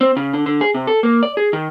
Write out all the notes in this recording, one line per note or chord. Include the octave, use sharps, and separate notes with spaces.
C4
C#3
D3
D3
G#4
C3
A4
A#3
D5
G#4
D#3